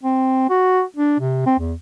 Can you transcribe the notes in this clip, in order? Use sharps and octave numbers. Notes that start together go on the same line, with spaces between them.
C4
F#4
D4
C3
C4
E2